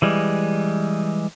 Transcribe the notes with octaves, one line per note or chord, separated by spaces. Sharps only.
E3 G3 G#3